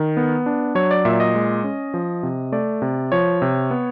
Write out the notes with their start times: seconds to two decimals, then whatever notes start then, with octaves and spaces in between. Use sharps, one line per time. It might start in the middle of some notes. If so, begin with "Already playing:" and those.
Already playing: D#3
0.17 B3
0.46 D4
0.75 F#3 C#5
0.91 D5
1.05 A#2 E5
1.13 D5
1.20 D#5
1.35 G#3
1.64 C#4
1.94 F3
2.23 C3
2.52 A3 D5
2.82 C3
3.12 F3 C#5
3.42 C3
3.71 B3